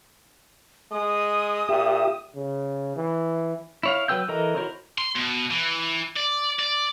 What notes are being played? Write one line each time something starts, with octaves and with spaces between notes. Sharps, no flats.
G#3 D#6
A#2 G4 E5
C#3
E3
E4 C#5 F5
F#3 B4 G5 E6 G6
E3 A4 A#4 D#5 A#5
E4 F#4 A#4 C5 C#5
C6
B2
E3
D5
D5